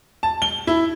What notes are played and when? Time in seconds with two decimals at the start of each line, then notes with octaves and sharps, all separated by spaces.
0.23 A5
0.42 G7
0.67 E4